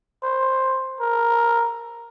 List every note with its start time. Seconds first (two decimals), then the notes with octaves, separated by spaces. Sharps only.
0.23 C5
1.00 A#4